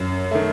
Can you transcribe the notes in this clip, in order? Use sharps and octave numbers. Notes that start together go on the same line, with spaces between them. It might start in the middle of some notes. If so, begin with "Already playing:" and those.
Already playing: F#2
D#3 A3